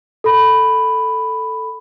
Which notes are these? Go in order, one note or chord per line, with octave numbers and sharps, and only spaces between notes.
A4 B5